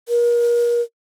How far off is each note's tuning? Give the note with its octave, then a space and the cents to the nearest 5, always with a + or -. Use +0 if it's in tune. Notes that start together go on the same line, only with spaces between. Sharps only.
A#4 +35